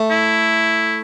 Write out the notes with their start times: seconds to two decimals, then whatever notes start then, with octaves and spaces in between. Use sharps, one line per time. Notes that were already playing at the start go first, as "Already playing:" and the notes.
Already playing: A3
0.10 E4